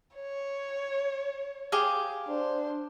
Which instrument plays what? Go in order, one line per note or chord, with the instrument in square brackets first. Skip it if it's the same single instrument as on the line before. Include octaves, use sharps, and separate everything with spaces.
[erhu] C#5
[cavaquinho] G4 G#4 F5
[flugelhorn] D4 [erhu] C5